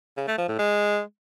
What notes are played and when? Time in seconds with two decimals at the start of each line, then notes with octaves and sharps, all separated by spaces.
0.17 C#3
0.27 A3
0.38 F3
0.48 A2
0.59 G#3